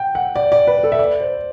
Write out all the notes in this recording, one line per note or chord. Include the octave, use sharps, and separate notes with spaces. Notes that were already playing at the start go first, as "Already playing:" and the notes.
Already playing: F#5 G5
F#5
D5
D5
B4
A4
E5
D5
C5